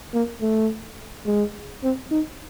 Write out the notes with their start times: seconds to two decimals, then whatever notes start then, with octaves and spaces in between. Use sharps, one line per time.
0.14 A#3
0.42 A3
1.26 G#3
1.83 C4
2.11 D#4